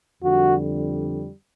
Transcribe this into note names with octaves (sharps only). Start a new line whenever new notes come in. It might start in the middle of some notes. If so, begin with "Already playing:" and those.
F2 D3 G3 F#4